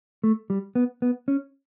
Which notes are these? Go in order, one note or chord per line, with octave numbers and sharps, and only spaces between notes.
A3
G3
B3
B3
C#4